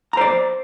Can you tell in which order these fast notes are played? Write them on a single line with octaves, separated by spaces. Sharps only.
A#5 C5 D5